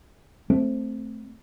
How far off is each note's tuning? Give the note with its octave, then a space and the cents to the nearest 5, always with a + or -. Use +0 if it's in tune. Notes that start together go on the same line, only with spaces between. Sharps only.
A3 +0 C4 +0